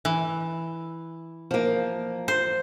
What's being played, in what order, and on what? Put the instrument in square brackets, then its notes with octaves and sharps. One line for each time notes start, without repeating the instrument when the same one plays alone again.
[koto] E3
[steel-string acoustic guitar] F3 A#3
[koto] C5